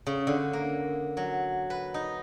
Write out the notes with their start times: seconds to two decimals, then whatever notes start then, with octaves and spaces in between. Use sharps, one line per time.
0.06 C#3
0.27 D3
0.53 A#3
1.17 F#3
1.70 B4
1.94 D#4